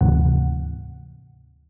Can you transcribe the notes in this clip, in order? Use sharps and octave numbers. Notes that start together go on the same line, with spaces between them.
D2 G#2 C3 E3 F#5